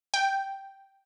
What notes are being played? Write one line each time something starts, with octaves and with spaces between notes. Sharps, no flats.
G5